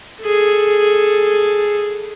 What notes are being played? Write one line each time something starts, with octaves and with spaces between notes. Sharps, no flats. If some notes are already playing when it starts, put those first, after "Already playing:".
G#4 A4